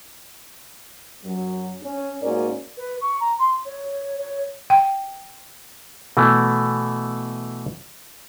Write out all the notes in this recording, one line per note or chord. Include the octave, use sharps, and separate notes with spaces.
F#2 F#3
C#4
G#2 A#3 C#4 F#4 A#4 D5
B4
C#6
A#5
C6
C#5
C#5
G5
B2 E3 A3